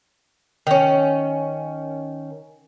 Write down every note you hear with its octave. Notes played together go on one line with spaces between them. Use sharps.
D#3 C#4